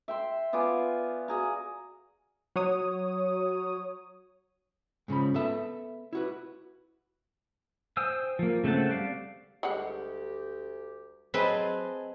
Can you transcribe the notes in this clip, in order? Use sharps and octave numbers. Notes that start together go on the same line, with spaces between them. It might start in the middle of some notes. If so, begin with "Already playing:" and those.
E5 G5 C6
B3 F4 D5 G#5
F#4 G#4 A#5
F#3 C#5 D#6
G#2 C#3 F3 B5
B3 A4 E5
E4 F#4 B4
C5 G5 G#5 D#6 E6
F3 A#3
C#3 A3 C4 F#4 A5
G3 D5 F5
D2 G3 G#3 G4 F#5
F#3 C4 G#4 B4 D#5 A5